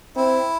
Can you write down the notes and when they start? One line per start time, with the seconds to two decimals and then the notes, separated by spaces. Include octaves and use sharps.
0.16 C4 E4